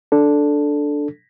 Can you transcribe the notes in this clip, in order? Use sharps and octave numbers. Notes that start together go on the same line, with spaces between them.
D4 A4